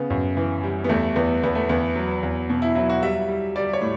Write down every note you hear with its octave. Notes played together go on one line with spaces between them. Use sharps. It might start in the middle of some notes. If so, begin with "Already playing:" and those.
Already playing: C#3 B3
F#2
E3
G3
B3
E2 A3
E2 B3
E2 B3
A3
E2 B3
F#3
E2
B2
E4
F#3 E4
F#4
G3 E5
G3
G3 D5
C#5
A2